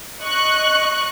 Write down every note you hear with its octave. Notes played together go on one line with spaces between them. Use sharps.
D#5 C#6 F#6